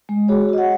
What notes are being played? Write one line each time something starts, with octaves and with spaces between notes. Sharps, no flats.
G#3
F#4 G#4 C#5
F#4 D#5
C#5 F#5